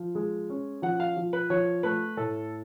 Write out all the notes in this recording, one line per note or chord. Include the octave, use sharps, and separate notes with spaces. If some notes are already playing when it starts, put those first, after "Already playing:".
Already playing: F3
G#3
C#4
F3 F#5
F5
F3
B4
F3 C#5
A3 B4
A2 A4